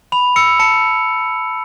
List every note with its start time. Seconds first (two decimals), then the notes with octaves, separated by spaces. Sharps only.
0.12 B5 F7
0.36 E6 C#7
0.59 A5 C#7